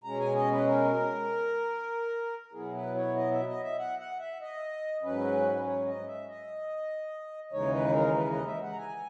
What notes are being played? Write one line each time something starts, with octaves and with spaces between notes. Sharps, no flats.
B2 G#3 C#4 A#5
G#5
D#5
B4
A#4
B2 F#3 B3 E4 G#4
B4
C#5
D#5
E5
D#5
E5
F#5
F#5
E5
D#5
G#2 F#3 C#4 B4
C#5
D#5
E5
D#5
D#2 C#3 E3 G#3 D#4 C#5
B4
A#4
B4
D#5
E5
F#5
A#5
G#5